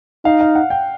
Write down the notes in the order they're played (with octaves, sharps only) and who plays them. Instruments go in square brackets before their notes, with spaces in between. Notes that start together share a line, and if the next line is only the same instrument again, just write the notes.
[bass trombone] D#4 [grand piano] F5
[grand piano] F5
F#5
G5